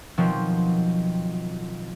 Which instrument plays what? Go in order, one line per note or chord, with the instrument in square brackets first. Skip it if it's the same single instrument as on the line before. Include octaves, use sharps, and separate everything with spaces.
[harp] B2 D#3 F3 F#3 C4